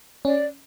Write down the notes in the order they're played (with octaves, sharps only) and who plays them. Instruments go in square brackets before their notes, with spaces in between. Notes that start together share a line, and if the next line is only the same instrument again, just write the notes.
[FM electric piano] C#4 [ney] D5